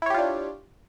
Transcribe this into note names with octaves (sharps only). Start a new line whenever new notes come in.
D4 E4 F4 G4 C#5